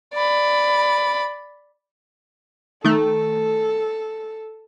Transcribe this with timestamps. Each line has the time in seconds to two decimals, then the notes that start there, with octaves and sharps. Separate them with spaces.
0.13 D5 B5
2.84 D#3 A3 A4